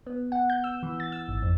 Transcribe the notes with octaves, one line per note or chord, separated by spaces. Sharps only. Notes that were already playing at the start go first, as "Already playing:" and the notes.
B3
F#5
G6
E6
E3
A6
E6
G#1
F2